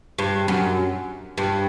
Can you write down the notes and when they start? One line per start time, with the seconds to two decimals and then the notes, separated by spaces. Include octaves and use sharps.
0.18 G2
0.48 F#2
1.38 G2